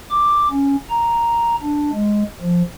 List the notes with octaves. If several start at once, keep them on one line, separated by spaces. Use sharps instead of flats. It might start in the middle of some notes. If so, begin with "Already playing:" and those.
D6
C#4
A#5
D4
G#3
F3